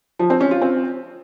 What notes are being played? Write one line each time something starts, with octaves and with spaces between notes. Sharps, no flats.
F3
C4
C#4
F4
C4